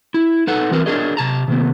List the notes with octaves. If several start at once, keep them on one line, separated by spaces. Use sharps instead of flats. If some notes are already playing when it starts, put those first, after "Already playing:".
E4
D#4 A4 B4 F#5
E3 C4 F#4 A#4 B4
D4 F#4 G#4 A#4 C#5 D#5
C3 A5 A#5
C3 D#3 A#3 B3